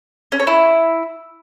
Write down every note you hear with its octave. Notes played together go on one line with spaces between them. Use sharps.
C#4
C#5
E4